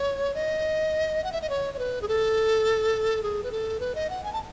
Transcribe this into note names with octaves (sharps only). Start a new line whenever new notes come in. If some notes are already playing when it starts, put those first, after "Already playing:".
Already playing: C#5
D#5
F#5
E5
D#5
C#5
C#5
B4
G#4
A4
G#4
B4
A4
B4
D#5
F#5
G#5
A5